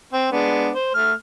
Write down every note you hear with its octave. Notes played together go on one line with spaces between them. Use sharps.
C4
G#3 B3 D4
C5
A3 F6